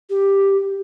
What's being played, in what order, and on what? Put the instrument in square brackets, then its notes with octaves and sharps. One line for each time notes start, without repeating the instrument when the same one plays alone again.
[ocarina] G4